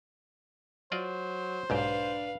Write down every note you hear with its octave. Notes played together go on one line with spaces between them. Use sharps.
F#3 F4 C5 D5 D#5
B1 G#2 D4 G4 B4 F5